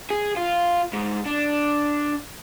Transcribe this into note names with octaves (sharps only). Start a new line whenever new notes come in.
G#4
F4
G#2
D4